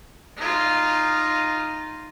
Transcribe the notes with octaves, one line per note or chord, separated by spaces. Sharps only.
D#4 F4